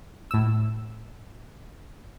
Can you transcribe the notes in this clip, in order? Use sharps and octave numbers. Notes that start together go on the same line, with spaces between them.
A2 E6